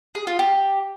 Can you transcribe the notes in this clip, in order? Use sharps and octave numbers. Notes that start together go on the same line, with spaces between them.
G#4
F4
G4